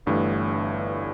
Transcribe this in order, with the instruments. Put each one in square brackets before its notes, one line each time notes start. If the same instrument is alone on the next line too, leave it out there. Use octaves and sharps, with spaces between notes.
[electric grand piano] G1 G2 E3 A3